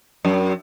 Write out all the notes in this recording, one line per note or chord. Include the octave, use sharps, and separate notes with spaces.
F#2